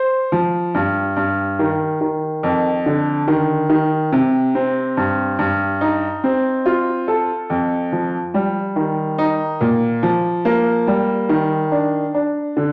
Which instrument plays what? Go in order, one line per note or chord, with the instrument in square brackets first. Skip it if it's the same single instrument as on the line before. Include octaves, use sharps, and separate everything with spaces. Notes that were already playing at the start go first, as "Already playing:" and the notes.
Already playing: [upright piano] C5
F3
G2
G2
D#3
D#3
F2
D3
D#3
D#3
C3
C4
G2
G2
D#4
C4
F4
A4
F2
F3
G3
D#3
D#4
A#2
F3
A#3
G3
D#3
D4
D4
D3